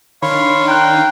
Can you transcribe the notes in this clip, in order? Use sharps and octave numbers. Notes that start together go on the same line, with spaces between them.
D#3 D4 C#5 F5 B5 C6
G5 A#5 F#6